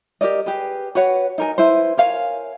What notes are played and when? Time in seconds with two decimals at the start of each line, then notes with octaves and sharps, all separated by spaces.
0.21 G4 A#4 D5 D#5
0.46 G4 G#4 B4
0.95 F#4 B4 C#5 F#5
1.38 D#4 A#4 G#5
1.58 E4 B4 C5
1.97 A#4 C#5 F5 G#5